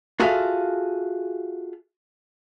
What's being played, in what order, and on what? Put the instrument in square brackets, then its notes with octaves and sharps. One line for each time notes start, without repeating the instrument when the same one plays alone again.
[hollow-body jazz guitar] F4 F#4 G#4 A4 E5 F5